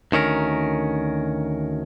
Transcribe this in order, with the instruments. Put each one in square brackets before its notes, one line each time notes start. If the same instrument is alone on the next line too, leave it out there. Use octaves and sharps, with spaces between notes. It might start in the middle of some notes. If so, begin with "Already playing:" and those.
[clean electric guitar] D2 D#3 C#4 A#4